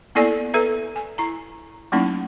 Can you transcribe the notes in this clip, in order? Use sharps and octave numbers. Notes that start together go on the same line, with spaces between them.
A#3 B3 E4 A4 D5 G#5
A4 B4 E5 A#5
G#5
E4 A#5
F#3 A3 A#3 C#4 D#4 E4